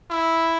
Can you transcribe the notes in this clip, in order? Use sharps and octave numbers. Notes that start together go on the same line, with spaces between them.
E4